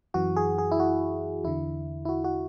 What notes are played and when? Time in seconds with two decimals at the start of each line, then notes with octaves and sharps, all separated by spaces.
0.14 F#2 E3 F#4
0.36 G#4
0.58 G#4
0.71 E4
0.80 F#4
1.44 E2 D3 E4
2.05 E4
2.09 F#4
2.24 F#4